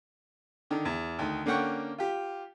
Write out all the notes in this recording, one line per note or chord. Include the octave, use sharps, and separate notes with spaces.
D3 D#3
E2
D2 D#3
D3 A#3 C#4 F#5 G5 C#6
F4 G4